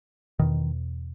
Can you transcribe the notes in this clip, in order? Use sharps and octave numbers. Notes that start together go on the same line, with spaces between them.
E2 B2 D#3